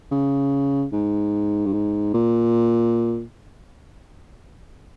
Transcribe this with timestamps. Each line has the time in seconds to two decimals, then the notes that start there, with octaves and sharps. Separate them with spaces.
0.12 C#3
0.92 G#2
1.66 G2
1.73 G#2
2.14 A#2